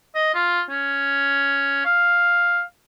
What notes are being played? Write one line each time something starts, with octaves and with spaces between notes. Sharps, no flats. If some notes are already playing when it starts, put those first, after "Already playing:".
D#5
F4
C#4
F5